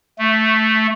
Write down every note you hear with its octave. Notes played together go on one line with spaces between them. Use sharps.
A3